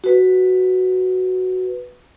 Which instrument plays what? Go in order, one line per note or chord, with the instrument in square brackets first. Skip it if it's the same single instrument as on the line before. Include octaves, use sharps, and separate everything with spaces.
[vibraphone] F#4 B4